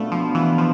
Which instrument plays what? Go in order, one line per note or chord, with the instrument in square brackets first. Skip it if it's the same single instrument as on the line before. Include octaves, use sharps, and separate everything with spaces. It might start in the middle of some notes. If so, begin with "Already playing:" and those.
Already playing: [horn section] B2 B3 D4 F4 [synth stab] A3
[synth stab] F3
E3
F3